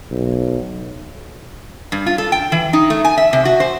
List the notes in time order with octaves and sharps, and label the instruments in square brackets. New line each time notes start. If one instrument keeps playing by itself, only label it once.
[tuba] B1
[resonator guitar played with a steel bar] G2
F4
A4
G5
E3
D#4
A3
G#5
E5
C3
F#4
C5